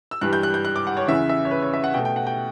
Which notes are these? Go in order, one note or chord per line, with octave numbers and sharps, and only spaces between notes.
E6
G2 E3 G3 F#6
G6
F#6
G6
F#6
D6
F#5
C#5
E2 C#3 E3 E5
E5
C#5
B4
C#5
E5
F#5
B2 G5
A3
G5
F#5
G5